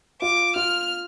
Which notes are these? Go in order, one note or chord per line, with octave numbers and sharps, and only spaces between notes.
F4 D6
F4 F6